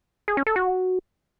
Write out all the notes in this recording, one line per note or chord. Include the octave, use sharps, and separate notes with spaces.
G#4
C#4
A4
F#4